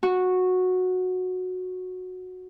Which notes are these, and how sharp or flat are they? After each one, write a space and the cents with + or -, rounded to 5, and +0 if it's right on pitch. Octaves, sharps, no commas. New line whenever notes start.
F#4 -10